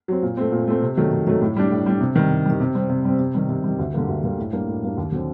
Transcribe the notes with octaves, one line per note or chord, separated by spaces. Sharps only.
F#3 C4
A#2
A3 C4
A#2
A3 C4
C3
D#3 F#3 A3
C3
D#3 F#3 A3
A2
G3 D4
A2
G3 D4
C3
D#3 G3
C3
D#3 G3
C3
G3 C4
C3
G3 C4
C3
D#3 G3
C3
D#3 G3
D2
D3 G3 A#3
D2
D3 G3 A#3
A2
G3 A#3 D4
A2
G3 A#3 D4
D#2
D3 F#3 C4